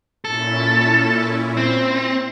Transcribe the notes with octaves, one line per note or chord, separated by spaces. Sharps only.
A#2 C#4 E4 A4
C4